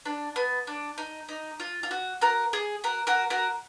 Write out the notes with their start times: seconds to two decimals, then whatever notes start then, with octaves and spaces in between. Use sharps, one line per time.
0.05 D4
0.36 B3
0.67 D4
0.98 D#4
1.29 D#4
1.60 F4
1.83 F4
1.91 F#4
2.21 F#4 A#4
2.53 G#4
2.84 F#4 A#4
3.07 F#4 A#4
3.30 F#4 A#4